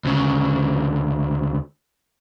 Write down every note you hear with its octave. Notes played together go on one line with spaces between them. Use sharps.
D2 C#3